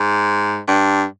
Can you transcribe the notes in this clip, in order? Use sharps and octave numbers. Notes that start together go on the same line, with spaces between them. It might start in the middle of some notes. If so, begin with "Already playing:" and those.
Already playing: G#2
G2